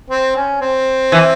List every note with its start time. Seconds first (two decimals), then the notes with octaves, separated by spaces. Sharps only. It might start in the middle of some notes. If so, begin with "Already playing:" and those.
0.10 C4
0.36 C#4
0.61 C4
1.12 E3